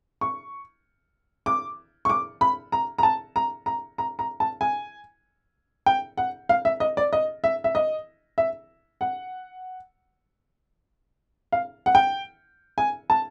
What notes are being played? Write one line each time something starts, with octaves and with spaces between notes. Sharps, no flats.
C#6
D6
C#6
D6
B5
A#5
A#5
A5
A#5
A#5
A#5
A#5
A5
G#5
G5
F#5
F5
E5
D#5
D5
D#5
E5
E5
D#5
E5
F#5
F5
F#5
G5
G#5
A5